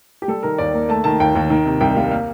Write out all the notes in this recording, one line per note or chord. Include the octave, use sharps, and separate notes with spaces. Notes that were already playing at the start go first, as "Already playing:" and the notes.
G4
G3 A4
D#3 A#4
D#2 D5
A#3
A3 A5
D#3 A5
D#2 G5
D#2
D#3
C3
C2 G5
G3 F5
A#3 F5